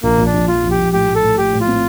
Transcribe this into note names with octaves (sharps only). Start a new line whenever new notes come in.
A#1 A#3
A#1
D4
A#1
F3 F4
A#1
G4
A#1
A2 G4
A2
A4
A2
A2 G4
A2
F4
C4